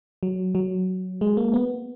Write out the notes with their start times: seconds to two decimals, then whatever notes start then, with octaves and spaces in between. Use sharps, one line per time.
0.23 F#3
0.55 F#3
1.21 G#3
1.37 A#3
1.54 B3